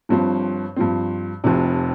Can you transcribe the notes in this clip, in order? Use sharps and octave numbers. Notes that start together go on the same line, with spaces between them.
G1 G2 F3 C4
G2 F3 C4
F1 F2 C3